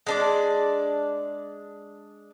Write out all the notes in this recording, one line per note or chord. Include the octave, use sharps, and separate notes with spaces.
G#3 D4 D5